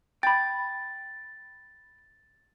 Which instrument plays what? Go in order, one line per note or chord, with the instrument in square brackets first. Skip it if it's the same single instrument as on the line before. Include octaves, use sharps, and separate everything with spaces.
[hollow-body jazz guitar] G5 B5 [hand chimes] A6